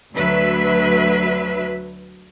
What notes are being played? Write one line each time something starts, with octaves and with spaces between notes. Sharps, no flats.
D2 D3 F#3 B4 E5